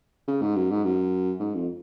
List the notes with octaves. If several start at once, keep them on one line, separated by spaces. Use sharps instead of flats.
C#3
G#2
F#2
G#2
F#2
G#2
F2